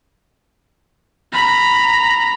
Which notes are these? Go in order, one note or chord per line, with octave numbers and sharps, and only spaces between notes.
A#5 B5